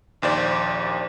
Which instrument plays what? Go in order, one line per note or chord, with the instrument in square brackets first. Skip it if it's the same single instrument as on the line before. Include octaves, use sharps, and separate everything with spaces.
[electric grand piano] A#1 D#2 C5 D5